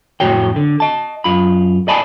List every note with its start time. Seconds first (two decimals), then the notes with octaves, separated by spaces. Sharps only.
0.20 F2 A2 F#4 C#5 G5
0.56 D3
0.80 D#5 A5
1.24 F#2 F4 B5
1.88 D5 D#5 G#5 A5 B5